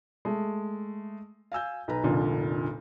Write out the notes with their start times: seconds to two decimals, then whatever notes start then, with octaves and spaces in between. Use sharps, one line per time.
0.25 G#3 A3
1.52 F5 G#5 E6 G6
1.88 B1 B4 A#5
2.04 F1 A#1 A#2 D3